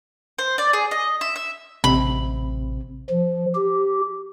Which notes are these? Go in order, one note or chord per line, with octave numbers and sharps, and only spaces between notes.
C5
D5
G#4
D#5
E5
E5
A1 C3 C4 B5
F3
G4